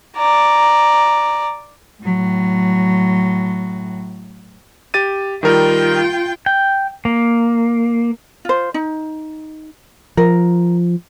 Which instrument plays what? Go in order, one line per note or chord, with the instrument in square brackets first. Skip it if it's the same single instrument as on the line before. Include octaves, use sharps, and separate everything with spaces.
[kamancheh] D5 A#5
[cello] A2 F#3
[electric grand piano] G4 A6 D#7
[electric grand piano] D#3 G3 A#4 [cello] F4 G5
[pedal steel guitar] G5
A#3
[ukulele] F4 C5
D#4
[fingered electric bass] F3 [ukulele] A#4